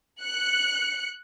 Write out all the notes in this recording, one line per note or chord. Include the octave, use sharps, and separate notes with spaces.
F#6 C#7